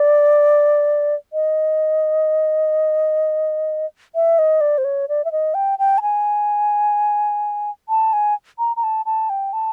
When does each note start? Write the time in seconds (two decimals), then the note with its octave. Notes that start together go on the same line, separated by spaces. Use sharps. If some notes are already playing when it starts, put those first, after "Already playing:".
Already playing: D5
1.33 D#5
4.15 E5
4.39 D#5
4.61 D5
4.78 C5
4.85 C#5
5.09 D5
5.25 E5
5.32 D#5
5.54 G5
5.79 G5
5.98 A5
6.02 G#5
7.89 A5
8.13 G#5
8.59 A#5
8.77 A#5
8.83 A5
9.06 A5
9.30 G5
9.53 A5